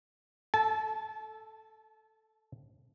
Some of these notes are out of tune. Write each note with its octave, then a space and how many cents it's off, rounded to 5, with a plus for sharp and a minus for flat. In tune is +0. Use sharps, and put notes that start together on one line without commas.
A4 +0 A5 -30